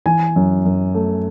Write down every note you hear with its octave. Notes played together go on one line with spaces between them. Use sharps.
E3 G#5
F#2
F#2
A3